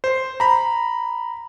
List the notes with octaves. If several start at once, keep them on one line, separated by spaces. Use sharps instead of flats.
C5
A#5 B5